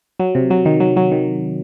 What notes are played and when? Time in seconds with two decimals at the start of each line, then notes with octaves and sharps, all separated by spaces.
0.20 F#3
0.35 C3
0.50 F#3
0.65 D#3
0.80 F#3
0.96 F#3
1.12 D#3